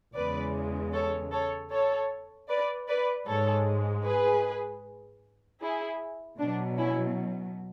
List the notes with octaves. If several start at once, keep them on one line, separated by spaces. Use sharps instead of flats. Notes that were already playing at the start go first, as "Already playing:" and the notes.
E2 C#3 G#3 B4 D5
A4 C#5
A4 C#5
A4 C#5
B4 D5
B4 D5
G#2 G#3 A4 C#5
G#4 B4
E4 G#4
B2 F#3 D4
C#4 E4